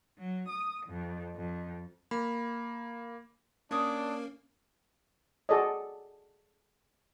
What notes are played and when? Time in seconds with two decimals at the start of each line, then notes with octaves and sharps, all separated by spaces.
0.19 F#3
0.48 D#6
0.87 F2
1.36 F2
2.11 A#3 B5
3.71 A#3 C#4 D4 C#5 D#6
5.49 F#4 G#4 A4 D5 D#5